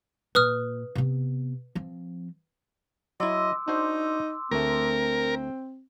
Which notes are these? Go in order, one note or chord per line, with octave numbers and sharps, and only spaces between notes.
A#2 B4 D#6 F6
C3 B3
F3 C4
F#3 E4 D#5 C6 D6 E6
D4 D#4 F#4 C5
D2 A3 C4 A#4